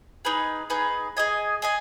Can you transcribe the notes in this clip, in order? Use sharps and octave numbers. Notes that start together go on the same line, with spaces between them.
D#4 G#4 B4
D#4 G#4 B4
G#4 D#5 G#5
G#4 D#5 G#5